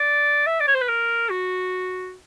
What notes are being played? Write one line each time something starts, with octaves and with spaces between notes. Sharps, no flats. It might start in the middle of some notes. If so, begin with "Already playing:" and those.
Already playing: D5
E5
D5
C#5
C5
B4
A#4
F#4